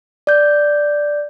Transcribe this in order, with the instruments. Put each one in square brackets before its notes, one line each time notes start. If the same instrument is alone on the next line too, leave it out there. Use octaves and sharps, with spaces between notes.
[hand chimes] D5 G6